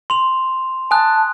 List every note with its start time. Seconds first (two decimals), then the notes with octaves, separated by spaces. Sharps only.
0.10 C6 F7
0.91 G#5 A5 D#6 F#6